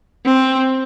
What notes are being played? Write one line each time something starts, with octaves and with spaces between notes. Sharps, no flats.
C4